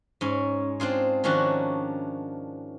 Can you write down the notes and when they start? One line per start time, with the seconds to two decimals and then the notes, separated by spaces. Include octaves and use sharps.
0.21 G#2 C#4
0.80 C4 D4 F4 G#4
1.24 D#3 F3 C#4 D4 F#4